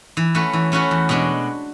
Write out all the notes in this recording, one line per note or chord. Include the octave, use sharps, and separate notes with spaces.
E3
A3 C#4 F#4 B4
E3
A3 C#4 F#4 B4
E2
B2 G#3 B3 D4